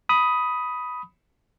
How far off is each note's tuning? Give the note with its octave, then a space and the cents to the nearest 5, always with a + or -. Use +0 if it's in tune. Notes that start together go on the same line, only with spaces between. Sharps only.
B5 +0 D#6 +10